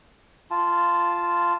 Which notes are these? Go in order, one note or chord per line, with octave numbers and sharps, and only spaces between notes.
F4 A5